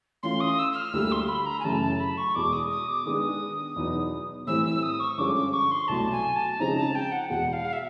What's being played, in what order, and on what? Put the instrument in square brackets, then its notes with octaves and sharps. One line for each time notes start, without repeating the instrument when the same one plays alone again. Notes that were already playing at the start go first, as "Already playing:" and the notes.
[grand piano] E3 A3 C#4 F4 [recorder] C6
[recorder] D#6
E6
E6
F6
[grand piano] D2 D3 G3 A#3 D4 [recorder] E6
[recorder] C6
B5
A#5
G#5
[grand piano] F#2 C#3 E3 A3 [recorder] A5
[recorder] A5
B5
C#6
[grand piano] E2 B2 G#3 [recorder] D6
[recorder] D#6
D#6
D6
[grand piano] D#3 G#3 B3 D4 [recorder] D#6
[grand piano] E2 B2 F#3 B3 D#4
[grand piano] A2 E3 G3 C4 E4 [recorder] E6
[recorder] E6
D#6
C#6
[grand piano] G2 D3 F3 G#3 C#4 [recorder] D6
[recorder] D6
C#6
C6
[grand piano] C2 B2 F#3 A3 [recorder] A5
[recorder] G#5
A5
[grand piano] C#3 F3 G#3 C4 D#4 [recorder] A#5
[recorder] A5
G5
F#5
[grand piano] E2 B2 G#3 [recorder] F#5
[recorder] F5
E5